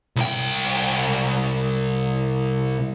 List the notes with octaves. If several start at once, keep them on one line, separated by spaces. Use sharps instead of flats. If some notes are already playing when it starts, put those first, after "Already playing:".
C2 G5